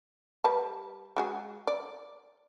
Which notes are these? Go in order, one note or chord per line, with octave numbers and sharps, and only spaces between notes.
G3 B4 A5
G#3 F#4 G#4
D5